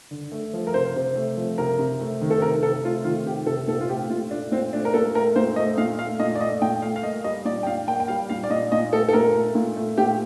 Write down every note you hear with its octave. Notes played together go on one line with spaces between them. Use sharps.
D3
A3
F3
A#4
C3 C5
C3
A3
F3
C3 A#4
C3
A3
D#3
A4
C3 A#4
C3 A4
A3 F4
D#3 F4
C3 G4
C3 A4
A#2 A4
F4
A3 G4
A#2 F4
A3 D4
A#2 C4
A3 D4
A#4
A#2 A4
A3 A#4
A#2 C5
A3 D#5
A#2 F5
A3 F5
A#2 D#5
D5
A3 D#5
A#2 G5
A3 F5
F5
A#3 D#5
G3 D#5
A#2 D5
G5
A#2 F5
A#3 G5
G5
G3 F5
A#2 F5
D5
A#2 D#5
A#2 D#5
A3 A4
A4
A#2 A#4
A3
A#2
A3
A#2 G4